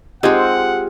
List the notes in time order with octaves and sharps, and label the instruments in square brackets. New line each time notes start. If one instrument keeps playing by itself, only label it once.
[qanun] G#3 C4 [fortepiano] D#4 [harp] F4 G4 G#4 [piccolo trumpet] F#5